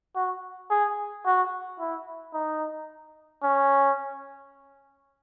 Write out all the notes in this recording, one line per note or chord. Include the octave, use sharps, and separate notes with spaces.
F#4
G#4
F#4
E4
D#4
C#4